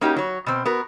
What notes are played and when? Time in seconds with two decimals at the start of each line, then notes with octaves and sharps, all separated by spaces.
0.01 A#3 C#4 D#4 F#4 G4
0.16 F#3 C#5
0.46 B2 C4
0.65 B3 F#4 A#4